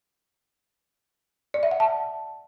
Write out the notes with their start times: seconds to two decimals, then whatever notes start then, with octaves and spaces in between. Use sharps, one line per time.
1.54 D5
1.63 E5
1.71 F#5
1.80 A5